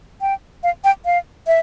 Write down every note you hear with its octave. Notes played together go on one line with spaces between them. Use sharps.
G5
F5
G5
F5
E5